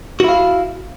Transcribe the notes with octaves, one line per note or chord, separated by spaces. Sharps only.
E4 F#4 F5